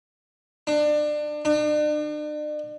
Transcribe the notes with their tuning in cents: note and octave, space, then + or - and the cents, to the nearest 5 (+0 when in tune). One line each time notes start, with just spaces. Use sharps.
D4 +25
D4 +40